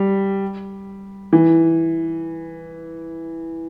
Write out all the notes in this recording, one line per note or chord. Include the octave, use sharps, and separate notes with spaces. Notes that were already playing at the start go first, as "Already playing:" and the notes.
Already playing: G3
E3